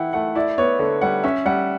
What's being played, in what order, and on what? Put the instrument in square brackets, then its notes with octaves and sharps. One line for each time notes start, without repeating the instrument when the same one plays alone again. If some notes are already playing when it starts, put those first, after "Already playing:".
Already playing: [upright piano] E3 E4 [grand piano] F#5 G5
[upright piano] A3 [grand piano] F#5
[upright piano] E4 [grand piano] D5
[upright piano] B3 [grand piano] C#5
[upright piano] D3
[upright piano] G3 [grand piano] F#5
[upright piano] C#4 [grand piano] E5
[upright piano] G3 [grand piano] F#5